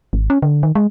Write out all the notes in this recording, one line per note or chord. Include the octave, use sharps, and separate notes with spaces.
G#1
C#4
D3
D#3
G#3